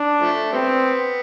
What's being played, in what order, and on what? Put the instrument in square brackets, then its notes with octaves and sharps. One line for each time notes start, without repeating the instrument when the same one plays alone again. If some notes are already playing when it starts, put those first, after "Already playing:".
Already playing: [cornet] D4
[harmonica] F3 A3
[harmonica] G3 B3 [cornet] C4